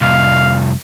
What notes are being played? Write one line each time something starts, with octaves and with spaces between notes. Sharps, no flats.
C2 F2 F5